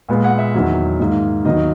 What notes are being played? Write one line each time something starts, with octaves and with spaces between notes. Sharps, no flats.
A#2 G#3 B3
F#5
E5
E2 D#3 F#3
G#2 D#3 A#3
D#2 D#3 F#3 B3 D#5